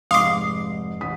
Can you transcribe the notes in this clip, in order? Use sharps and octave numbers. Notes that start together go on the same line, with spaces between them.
F1 G#2 F5 C6 D6 D#6 C7
A1 D#6 B6